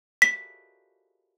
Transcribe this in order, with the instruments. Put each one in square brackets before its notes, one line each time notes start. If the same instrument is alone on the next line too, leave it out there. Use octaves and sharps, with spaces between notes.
[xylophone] B6